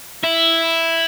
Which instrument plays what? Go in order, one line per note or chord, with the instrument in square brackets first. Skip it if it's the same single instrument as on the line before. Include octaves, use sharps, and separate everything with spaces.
[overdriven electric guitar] E4